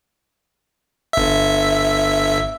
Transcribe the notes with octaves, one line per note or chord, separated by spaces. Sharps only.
G1 E5